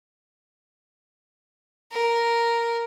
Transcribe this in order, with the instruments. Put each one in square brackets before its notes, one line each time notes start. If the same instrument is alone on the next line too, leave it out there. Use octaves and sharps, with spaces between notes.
[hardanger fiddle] A#4